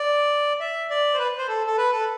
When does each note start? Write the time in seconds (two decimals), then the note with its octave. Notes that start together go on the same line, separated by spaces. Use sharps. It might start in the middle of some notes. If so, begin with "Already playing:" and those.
Already playing: D5
0.60 E5
0.90 D5
1.14 C5
1.19 B4
1.38 C5
1.48 A4
1.67 A4
1.78 B4
1.92 A4